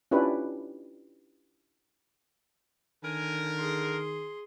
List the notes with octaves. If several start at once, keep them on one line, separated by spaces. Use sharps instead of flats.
C#4 D4 E4 F4 G4 B4
D3 D#3 A#4 G#5
G#4 C6